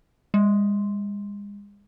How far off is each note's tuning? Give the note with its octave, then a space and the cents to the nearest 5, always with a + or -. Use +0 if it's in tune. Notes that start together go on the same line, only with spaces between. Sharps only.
G#3 -40